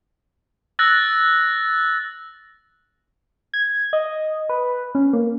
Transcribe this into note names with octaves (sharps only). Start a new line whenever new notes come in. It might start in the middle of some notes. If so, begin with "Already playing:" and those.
E6 F#6 A6 A#6
G#6
D#5
B4
C#4
A#3